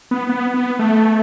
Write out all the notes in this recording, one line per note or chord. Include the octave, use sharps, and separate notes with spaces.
B3
B3
B3
A3